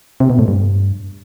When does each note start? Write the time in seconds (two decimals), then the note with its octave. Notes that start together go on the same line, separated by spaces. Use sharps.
0.20 C3
0.30 B2
0.39 A2
0.48 G2